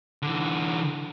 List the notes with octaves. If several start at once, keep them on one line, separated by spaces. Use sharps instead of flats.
D3 E3